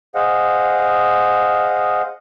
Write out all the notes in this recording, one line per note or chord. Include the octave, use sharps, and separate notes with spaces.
G#4 C5 D#5 F5 F#5